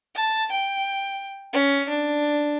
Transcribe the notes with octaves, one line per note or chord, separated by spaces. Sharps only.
A5
G5
C#4
D4